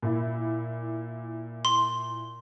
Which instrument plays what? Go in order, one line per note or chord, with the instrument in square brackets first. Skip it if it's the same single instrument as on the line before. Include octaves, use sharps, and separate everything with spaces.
[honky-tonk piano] A#2 E4
[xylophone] C6